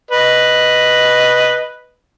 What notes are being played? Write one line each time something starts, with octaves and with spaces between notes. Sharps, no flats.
B4 D#5